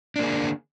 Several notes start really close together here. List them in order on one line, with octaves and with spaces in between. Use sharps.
D4 A#3 G#4 D3